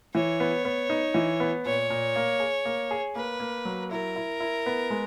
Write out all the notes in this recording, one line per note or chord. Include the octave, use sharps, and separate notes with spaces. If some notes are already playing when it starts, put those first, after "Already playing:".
E3 C#5
B3
B3
D#4
E3
B3
A#2 C#5
A#2
A#3
G#4
A#3
G#4
A#3 B4
A#3
F#3
E4 A#4
E4
E4
B3
G#3